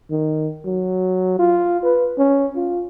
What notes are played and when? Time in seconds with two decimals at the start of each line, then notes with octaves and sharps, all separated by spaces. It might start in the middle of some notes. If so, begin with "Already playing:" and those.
0.11 D#3
0.66 F#3
1.39 F4
1.84 B4
2.18 C#4
2.56 F4